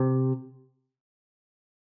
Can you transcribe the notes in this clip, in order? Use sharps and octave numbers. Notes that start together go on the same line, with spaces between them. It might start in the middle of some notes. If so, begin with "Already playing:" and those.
Already playing: C3